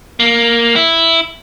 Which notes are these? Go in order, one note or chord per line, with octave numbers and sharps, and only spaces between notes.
A#3
E4